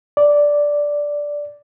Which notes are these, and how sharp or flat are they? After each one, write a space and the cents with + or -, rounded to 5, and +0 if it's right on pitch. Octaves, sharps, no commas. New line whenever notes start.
D5 -5